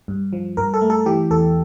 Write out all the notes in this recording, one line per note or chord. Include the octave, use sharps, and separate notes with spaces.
G2
F3
G2 A#4
A4
A3
A4
E3 G4
E2 A4